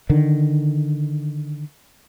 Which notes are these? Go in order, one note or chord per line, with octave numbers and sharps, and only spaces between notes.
D3 D#3